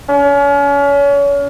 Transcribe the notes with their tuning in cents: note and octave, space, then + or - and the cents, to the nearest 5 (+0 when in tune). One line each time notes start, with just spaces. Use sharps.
C#4 +35